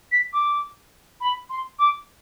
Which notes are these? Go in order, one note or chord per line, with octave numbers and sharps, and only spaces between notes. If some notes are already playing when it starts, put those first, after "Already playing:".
B6
D6
B5
C6
D6